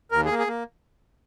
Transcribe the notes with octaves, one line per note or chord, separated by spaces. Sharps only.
D#2 A#4
G#4
A#3
G#4
A#3